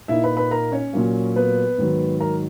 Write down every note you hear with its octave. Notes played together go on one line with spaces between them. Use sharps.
A#2 A#3 D#4 E4 E5
B4 B5
B4 B5
A#4 A#5
C#4 C#5
A#2 F#3 A#3
B3 B4
G#2 D#3 F#3
A#4 A#5